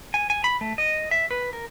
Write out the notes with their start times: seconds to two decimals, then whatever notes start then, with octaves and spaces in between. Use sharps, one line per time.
0.14 G#5
0.30 G#5
0.44 B5
0.61 A3
0.78 D#5
1.11 E5
1.31 B4
1.53 A#4